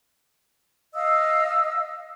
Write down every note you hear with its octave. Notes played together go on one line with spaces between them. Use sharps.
D#5 F5 D#6 E6